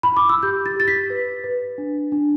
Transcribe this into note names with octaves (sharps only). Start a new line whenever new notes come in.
B5
D6
E6
G4 G6
A6
G4 A6
B6
B4
B4
D4
D4